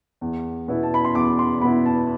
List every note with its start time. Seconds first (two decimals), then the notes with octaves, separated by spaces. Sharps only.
0.21 E2
0.68 B2 B3 E4
0.83 A5
0.94 B5
1.05 C6
1.15 E2 D6
1.39 C6
1.62 B2 B3 E4 B5
1.86 A5